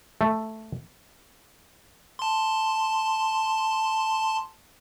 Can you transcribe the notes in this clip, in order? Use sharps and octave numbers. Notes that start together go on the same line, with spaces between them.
A3
A5 C6